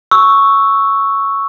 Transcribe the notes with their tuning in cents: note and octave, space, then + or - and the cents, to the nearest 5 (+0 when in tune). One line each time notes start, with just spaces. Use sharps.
C#6 +0 E6 -5